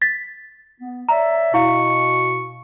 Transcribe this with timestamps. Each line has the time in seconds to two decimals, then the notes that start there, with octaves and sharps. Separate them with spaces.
0.02 A6 B6
0.79 B3
1.08 C#5 D5 E5 A#5
1.54 B2 E4 F5 C#6